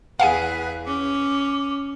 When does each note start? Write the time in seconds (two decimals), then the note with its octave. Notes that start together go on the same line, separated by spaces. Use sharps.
0.20 E2 G#4 B4 F5 F#5 G#5
0.86 C#4 D6